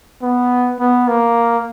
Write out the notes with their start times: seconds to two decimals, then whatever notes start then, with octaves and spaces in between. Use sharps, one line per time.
0.22 B3
0.80 B3
1.08 A#3